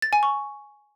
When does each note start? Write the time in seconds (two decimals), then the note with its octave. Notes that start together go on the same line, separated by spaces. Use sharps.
0.02 A6
0.13 G#5
0.23 C#6